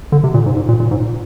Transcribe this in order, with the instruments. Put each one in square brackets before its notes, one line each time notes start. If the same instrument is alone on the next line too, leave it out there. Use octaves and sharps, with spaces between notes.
[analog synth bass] D3
C3
A#2
G#2
G#2
A#2
A#2
G#2